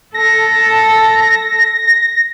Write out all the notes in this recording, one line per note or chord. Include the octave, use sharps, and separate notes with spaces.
A4 A#6